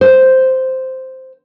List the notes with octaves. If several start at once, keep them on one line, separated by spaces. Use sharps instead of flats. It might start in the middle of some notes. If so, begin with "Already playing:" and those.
C5